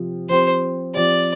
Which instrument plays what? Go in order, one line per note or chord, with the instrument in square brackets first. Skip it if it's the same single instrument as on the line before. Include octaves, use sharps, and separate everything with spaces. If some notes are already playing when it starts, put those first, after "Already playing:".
Already playing: [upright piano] C3 F3 C4
[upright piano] F3 C4 G4 [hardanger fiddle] C5
[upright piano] F3 C4 G4 [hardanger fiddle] D5